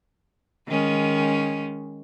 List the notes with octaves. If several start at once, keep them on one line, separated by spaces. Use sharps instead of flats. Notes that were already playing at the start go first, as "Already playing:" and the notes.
D#3 G#3 C#4